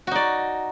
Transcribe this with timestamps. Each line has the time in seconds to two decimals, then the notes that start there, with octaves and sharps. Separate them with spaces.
0.07 F#4
0.11 D#4
0.15 D5